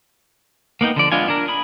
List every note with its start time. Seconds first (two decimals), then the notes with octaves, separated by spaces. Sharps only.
0.81 A#3 B3 D#4 G5
0.96 D3 F3 D5
1.12 G#3 B3 D4 F4 G#5
1.28 D4 A#4
1.48 G#4 B5